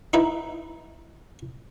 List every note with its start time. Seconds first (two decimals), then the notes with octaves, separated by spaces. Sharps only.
0.13 D#4 E4 B4